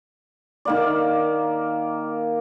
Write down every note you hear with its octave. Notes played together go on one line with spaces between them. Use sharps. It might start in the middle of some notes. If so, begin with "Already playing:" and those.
D#3 A#3 D5